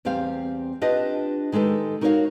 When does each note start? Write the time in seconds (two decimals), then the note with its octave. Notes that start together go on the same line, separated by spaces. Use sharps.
0.05 E2 G3 C4 G4 F5
0.81 D4 F4 G4 B4 D#5
1.52 D#3 G#3 G4 A4 B4
2.01 D#4 F#4 A#4 B4 C#5 F5